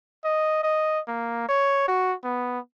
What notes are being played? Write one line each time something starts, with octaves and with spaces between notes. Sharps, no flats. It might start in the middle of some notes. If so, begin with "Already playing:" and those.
D#5
D#5
A#3
C#5
F#4
B3